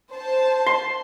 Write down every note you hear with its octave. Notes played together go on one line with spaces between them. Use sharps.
C5 A5
C6